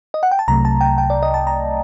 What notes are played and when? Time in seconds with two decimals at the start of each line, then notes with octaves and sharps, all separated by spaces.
0.14 D#5
0.23 F#5
0.31 G5
0.39 A5
0.48 C2 C3 F#3 A3 A#5
0.65 A5
0.81 G5
0.98 G5
1.10 D5
1.23 D#5
1.34 A5
1.47 A#5